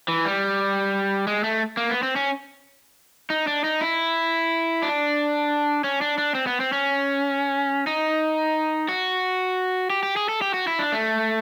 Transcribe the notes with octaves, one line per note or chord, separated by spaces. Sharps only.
E3
G3
G#3
A3
A#3
B3
C4
C#4
D#4
D4
D#4
E4
D4
C#4
D4
D4
C4
B3
C4
C#4
D#4
F#4
G4
G4
G#4
A4
G4
F#4
E4
D4
A3